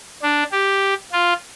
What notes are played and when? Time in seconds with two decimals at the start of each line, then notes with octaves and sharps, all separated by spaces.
0.23 D4
0.52 G4
1.12 F4